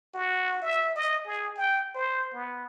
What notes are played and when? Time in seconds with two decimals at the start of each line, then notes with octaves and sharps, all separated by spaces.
0.14 F#4
0.62 E5
0.96 D#5
1.27 G#4
1.57 G5
1.95 C5
2.33 B3